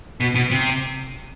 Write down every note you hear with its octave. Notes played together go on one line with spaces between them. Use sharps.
B2
B2
C3